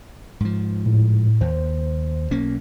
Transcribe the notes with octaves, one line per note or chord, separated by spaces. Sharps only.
G#2 F3
A2
D#2 C5
B1 A#3 C#4